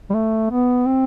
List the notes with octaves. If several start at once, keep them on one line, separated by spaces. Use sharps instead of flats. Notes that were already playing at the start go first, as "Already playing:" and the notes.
G3
A3
B3
C4